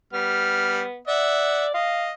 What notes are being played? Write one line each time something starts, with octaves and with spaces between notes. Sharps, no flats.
G3 B3 F6
D5 E5 F#5
D#5 F5